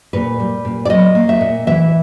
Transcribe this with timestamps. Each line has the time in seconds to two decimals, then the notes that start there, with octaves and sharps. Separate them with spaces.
0.13 A#2 B4
0.40 G3
0.65 A#2
0.85 D5
0.89 F#3 D#5
1.15 A#3
1.29 E5
1.41 A#2
1.67 E3 E5